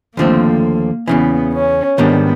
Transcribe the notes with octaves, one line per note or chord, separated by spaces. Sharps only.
D#2 D3 F3 A3 A#3 C4
E2 C#3 E3 B3
C#4
G#2 D#3 G3 A#3 B3 D4